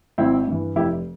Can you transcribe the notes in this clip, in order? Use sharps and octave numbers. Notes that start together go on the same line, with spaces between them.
G#1 C4 E4
G2 E3
F1 E4 G4